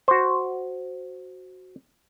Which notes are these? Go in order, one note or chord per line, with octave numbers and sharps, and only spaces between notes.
F#4 C5